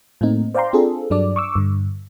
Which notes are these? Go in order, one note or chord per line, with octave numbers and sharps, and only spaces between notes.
A2 A3 A#3 C4 D#4
C5 D5 F5 G5 A#5 C6
C4 D4 F4 G#4 A4
G2 F#3 D4 D5
C#6 D6 E6
G2 D3